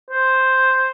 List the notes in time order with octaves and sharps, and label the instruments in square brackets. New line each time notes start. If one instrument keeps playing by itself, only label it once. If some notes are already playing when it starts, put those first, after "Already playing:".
[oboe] C5